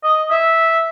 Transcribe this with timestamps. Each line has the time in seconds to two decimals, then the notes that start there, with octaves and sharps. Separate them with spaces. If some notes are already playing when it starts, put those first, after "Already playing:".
0.03 D#5
0.31 E5